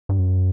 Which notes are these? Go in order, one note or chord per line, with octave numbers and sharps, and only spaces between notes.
G2
F#2